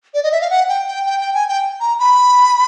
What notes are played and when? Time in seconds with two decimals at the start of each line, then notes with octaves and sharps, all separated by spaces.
0.14 D5
0.23 D#5
0.32 E5
0.41 F5
0.50 F#5
0.69 G5
0.87 G5
1.06 G5
1.20 G5
1.34 G#5
1.49 G5
1.81 A#5
1.99 B5